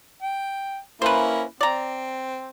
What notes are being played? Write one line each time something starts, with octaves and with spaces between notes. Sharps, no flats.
G5
A#3 C#4 E4 B4 C5
C4 D5 A#5